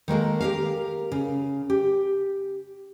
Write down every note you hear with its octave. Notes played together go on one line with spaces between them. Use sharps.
D#3 G#3 A#3 A4
G4 A#4 F5
C#3
G4